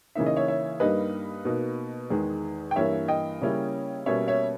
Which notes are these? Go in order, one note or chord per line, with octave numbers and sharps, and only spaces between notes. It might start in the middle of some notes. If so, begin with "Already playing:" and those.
C#3 E3 A#3 D#4 E5
D#5
C#5 E5
C#5 E5
G2 G3 A#3 D#4 B4 D#5
B2 A#3 D#4
E2 D#3 G#3
G5
G2 E3 A#3 C#5 E5
D#5 G5
C#3 G3 A#3 C#4 E4
B2 G3 A#3 C#4 C#5 E5
C#5 E5